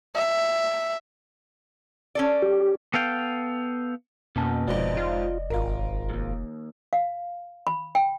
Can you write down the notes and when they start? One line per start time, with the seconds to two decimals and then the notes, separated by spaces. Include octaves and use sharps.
0.15 E5
2.15 C#4 A4 D5
2.42 G4
2.94 B3 A4 F5 G5
4.36 F2 B2 A#3 C#4 A5
4.68 F1 F2 G#2 F3 D5 D#5
4.97 F4
5.50 G#1 F4 A#4
6.10 D#2 G#2
6.93 F5
7.67 B5
7.95 G5